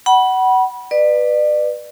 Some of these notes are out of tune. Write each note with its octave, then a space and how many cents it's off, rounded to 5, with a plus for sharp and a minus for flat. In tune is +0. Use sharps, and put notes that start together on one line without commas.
F#5 +25 B5 -25
B4 +0 D5 +35